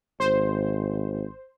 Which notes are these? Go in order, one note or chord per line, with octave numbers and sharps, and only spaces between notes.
G#1 C5